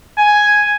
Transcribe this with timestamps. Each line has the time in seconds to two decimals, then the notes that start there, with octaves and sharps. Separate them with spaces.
0.18 G#5